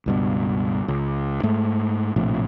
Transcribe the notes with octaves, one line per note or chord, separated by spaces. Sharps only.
C#2 G2 B2
C#2
G#2 A3
A#1 A2 C3 F3